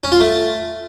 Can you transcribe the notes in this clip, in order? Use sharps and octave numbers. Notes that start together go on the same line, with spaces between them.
C#4
F4
A3